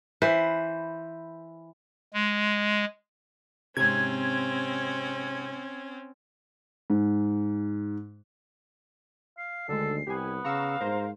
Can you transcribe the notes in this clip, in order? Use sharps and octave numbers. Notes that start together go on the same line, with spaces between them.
E3 B4 C5
G#3
G#2 C3 C4 C#4 G#6
G#2
F5 C7
D2 D3 D#3 G#3 A4
C2 B3 G4 G#5
C#3 F5 A#5 C#6 E6
G#2 A#4 C5 A#5